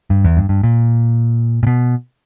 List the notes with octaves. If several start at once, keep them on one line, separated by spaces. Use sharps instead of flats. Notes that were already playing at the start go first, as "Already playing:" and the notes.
G2
E2
G2
G2
A#2
A#2
B2